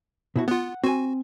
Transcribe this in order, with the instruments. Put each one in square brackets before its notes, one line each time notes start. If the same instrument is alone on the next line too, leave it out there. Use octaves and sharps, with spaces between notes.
[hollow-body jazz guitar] B2 E4 F#4
[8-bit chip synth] B3 F4 [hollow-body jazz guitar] F#5
[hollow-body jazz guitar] C4 G#5 [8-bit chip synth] F#4